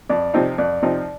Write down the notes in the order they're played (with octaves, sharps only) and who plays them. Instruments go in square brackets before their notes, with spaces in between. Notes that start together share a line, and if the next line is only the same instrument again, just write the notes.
[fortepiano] F2 [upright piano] D5
[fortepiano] C3 F3 C4 D#4
[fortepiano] F2 [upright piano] D5
[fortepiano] C3 F3 C4 D#4